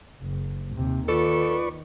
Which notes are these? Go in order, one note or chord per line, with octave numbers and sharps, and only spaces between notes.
F#1
D#2 C3
D#3 F4 A4 B4 D5 C#6